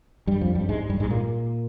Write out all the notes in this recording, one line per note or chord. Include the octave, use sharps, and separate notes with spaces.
G2 G3
F2 F3
G2 G3
G#2 G#3
G2 G3
G#2 G#3
A#2 A#3